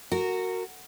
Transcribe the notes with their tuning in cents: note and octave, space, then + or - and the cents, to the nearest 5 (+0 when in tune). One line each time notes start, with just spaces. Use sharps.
F#4 +0 A#4 -20